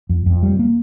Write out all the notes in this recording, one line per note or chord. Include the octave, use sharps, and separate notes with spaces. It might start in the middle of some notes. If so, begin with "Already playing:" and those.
F2
F2
G3
A#3